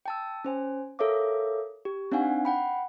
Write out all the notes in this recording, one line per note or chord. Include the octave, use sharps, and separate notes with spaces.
G5 A5 E6
C#4 C5 G#5
A4 A#4 C#5 E5 F5 D6
G4
C4 D4 D#4 F5 F#5 G#5
F#5 G5 B5